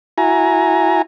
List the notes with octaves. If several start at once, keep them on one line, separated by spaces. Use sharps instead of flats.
E4 F#4 G#5 A#5